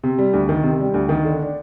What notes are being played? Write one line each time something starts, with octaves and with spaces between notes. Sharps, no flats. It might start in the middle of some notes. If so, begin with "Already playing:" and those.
C3
G3
D2
D#3
C3
G3
D2
D#3
D3
D4